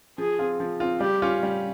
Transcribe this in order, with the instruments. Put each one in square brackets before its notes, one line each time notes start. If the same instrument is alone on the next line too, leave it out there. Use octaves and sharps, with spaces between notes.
[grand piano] F3 [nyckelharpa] G#4
[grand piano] C4 F4
F3
C4 F4
[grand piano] G3 [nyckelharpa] G4
[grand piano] C#4 F4
G3